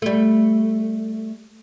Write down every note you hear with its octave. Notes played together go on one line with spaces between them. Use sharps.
G3 A3